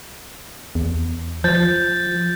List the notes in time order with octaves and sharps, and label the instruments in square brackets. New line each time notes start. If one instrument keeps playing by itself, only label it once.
[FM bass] E2
[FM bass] F3 [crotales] G6 A6